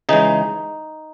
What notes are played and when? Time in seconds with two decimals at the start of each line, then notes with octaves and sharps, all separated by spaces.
0.09 C#3 E3 G#3 D#4